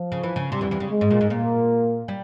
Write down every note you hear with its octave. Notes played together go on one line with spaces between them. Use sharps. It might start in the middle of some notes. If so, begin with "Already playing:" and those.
Already playing: F3
C#3
E3
C#3
C3 G3
E2 E3
E2 E3
C#3
G#3
G#2
A#2
G#2
A#2 A#3
G3